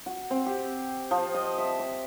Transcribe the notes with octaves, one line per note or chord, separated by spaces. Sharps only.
F#4
C4
G4
F3
D#5
E5
D6